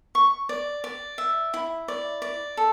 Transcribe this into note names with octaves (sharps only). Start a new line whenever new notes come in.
C#6
D5
D5
E5
E4
D5
D5
A4